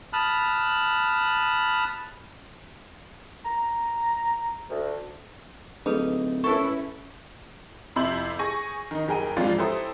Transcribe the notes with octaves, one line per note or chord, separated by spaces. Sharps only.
A5 B5 D#6 F6 F#6
A#5
D2
D1 D#4 G#4 A4 B4
C#4 E4 A4 B4 C#6
F2 C3 E4 C6 G6 F#7
G#4 G#5 C#6 A#6
D#3 D#4
F#1 G#4 A#4 G5 D#7
G#2 E3 F3 C4 D4 F4
E4 G4 A4 C5 A#5 D#6